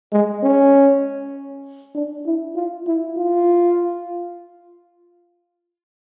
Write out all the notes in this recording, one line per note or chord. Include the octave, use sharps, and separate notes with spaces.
G#3
C#4
D4
E4
F4
E4
F4